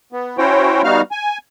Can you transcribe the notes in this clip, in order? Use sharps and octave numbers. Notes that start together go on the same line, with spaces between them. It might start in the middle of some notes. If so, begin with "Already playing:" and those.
B3
C#4 E4 F#4 C5 C#5 G5
G3 B3 D#4 F#4 F5 F6
G#5